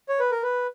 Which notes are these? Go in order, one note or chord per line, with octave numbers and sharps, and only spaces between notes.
C#5
B4
A#4
B4